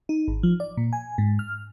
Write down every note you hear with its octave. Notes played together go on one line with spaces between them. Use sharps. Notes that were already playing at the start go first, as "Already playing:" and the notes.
D#4
G#1
F3
D5
A#2
G#5
G#2
F6